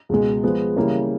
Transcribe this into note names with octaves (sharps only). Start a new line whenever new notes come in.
C#2 B2 G#3
F3 G#3 B3
C#3 E3 G3 A#3